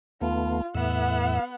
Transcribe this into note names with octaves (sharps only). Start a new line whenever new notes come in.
D#2 A3 B3 F4
E2 A2 B3 E5 F#5